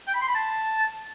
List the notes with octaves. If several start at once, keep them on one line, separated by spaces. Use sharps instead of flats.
G5
B5
C6
B5
A5